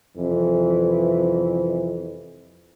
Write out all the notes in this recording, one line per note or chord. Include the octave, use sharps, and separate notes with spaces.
C2 F2 E3